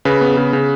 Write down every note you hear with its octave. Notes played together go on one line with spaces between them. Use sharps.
C#3 B4
B3
C#3
C#3